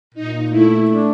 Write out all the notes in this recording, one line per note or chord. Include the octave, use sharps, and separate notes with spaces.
A#2 D#4
A3 E4
D4